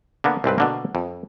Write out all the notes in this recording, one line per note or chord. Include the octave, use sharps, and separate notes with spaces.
D3 A#3 B3
C2 G#2 C4 B4
B2 D3 A#3
F2